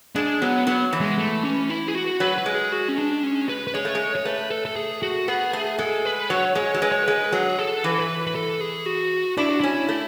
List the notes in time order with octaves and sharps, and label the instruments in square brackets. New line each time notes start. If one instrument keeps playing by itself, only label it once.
[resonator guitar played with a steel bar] G#3 [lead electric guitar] D4
[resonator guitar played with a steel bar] F#3 [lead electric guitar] B3
[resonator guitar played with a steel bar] F#3 [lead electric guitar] B3
[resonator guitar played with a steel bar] E3
[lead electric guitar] G#3
A3
C#4
E4
G#4
F#4
[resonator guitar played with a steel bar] F#3 [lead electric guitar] B4
[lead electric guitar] B4
[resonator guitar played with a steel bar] G#3
[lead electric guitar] G#4
F#4
C#4
D4
C#4
B4
B4
[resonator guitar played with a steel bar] G#3 [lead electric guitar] C#5
[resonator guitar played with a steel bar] A3
G#3
[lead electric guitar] C#5
[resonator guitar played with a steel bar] A3 [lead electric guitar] B4
[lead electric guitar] A4
A4
G#4
F#4
[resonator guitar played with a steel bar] B3 [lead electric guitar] G#4
[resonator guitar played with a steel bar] A3
[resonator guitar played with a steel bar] G#3 [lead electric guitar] A4
[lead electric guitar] B4
[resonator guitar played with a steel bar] F#3 [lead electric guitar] C#5
[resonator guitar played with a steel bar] G#3 [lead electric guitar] C#5
[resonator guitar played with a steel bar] F#3
[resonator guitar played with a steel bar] G#3 [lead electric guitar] B4
[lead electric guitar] C#5
[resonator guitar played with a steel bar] G#3 [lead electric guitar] B4
[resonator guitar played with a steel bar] F#3 [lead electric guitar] G#4
[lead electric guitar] A4
[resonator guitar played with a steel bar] E3 [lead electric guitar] B4
[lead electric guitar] A4
B4
B4
A4
G#4
F#4
[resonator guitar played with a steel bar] D4 [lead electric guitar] E4
[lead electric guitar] F#4
[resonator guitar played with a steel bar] C#4 [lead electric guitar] E4
[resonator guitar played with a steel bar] A3